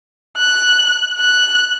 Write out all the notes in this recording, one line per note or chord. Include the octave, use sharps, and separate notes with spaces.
F#6
F#6